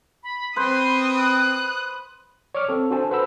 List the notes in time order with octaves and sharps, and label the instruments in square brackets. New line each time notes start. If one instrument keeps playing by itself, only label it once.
[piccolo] B5
[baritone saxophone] C4 [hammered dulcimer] B4 C5 [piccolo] C6 [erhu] D#6
[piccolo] F#6
[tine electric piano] C#5 D5 C#6 D6 F6
C4 A4
D4 F#4 A4 C5 G#5 A5
A4 B4 C5 F#5 B5 E6